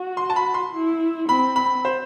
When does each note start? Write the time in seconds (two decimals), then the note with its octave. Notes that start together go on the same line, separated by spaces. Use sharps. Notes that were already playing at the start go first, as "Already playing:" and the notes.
Already playing: F#4
0.17 C6
0.30 A5
0.36 B5
0.54 C6
0.73 E4
1.28 C4 B5
1.56 B5
1.85 C5